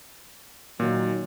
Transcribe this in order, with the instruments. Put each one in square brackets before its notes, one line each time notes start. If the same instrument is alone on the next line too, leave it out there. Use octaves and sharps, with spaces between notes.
[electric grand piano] A#2 [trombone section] D#3 F#3